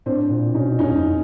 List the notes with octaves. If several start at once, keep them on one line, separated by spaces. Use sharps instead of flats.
A2 C4 D4
A#2
B2 C#4 D#4
F#2 C#4 D#4
E2
F2